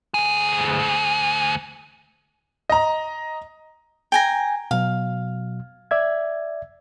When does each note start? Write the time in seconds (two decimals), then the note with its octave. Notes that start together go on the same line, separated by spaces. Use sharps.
0.14 D2 G#4
2.70 D#5 A#5
4.12 G5 G#5 A#5
4.71 B2 F#3 F5
5.91 D5 E5 G#6